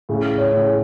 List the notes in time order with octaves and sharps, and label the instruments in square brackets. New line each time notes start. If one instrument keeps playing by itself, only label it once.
[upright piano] A2 C#3 [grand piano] G#4
[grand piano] C#5
[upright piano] A2 C#3
[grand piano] G#4